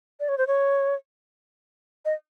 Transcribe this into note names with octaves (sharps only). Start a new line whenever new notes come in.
D5
C#5
C5
C#5
D#5